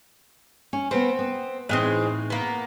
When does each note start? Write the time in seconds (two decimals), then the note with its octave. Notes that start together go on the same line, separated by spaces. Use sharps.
0.73 C#4
0.91 B3 C4 A#4 B4
1.19 B3
1.69 A2 E3 G#3 C4 D#4
2.30 A#3 B3